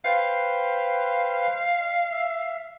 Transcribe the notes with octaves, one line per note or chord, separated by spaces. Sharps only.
B4 C5 F5 G5
E5